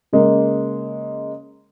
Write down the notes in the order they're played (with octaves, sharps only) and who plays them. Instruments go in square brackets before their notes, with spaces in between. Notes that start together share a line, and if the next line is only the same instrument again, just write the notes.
[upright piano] C#3 G#3 A#3